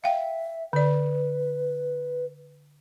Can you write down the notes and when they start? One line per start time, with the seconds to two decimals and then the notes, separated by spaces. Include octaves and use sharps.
0.04 E5 F5 G5
0.73 D3 B4 D5